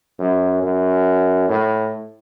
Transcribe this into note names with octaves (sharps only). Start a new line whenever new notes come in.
F#2
F#2
A2